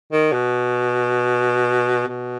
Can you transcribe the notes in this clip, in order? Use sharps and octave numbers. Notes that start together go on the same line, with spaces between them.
D#3
B2
B2